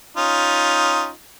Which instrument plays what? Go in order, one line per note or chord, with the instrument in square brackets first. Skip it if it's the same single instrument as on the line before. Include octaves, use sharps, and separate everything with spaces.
[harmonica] C#4 D#4 F4